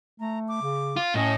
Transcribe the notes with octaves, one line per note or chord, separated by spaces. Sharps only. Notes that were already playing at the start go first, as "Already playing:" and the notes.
A3 A#5
D6
C#3
F4
A2 C#4 D#5